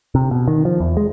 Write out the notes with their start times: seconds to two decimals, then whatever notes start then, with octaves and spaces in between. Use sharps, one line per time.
0.15 C3
0.31 B2
0.48 D#3
0.65 F3
0.80 E2
0.97 G#3